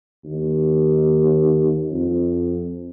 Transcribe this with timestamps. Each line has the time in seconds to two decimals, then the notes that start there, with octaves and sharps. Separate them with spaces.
0.24 D#2
1.92 F2